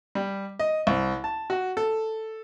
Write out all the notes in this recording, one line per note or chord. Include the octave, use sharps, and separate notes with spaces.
G3
D#5
C2
A5
F#4
A4